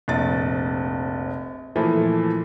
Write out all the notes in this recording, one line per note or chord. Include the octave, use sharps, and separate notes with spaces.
F1 A#1 A6
A#2 E3 F3 A3